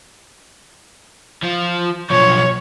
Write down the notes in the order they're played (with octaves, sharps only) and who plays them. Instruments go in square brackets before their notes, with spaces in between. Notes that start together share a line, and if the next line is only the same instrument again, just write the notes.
[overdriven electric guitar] F3 F4
[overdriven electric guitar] B1 F3 [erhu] C#5